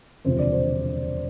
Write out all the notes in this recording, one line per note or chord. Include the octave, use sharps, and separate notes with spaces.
E1 D2 C3 F3 C5
D5
C5